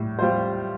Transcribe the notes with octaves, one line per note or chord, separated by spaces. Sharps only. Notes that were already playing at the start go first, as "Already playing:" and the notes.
Already playing: A2 G3
G3 F4 C5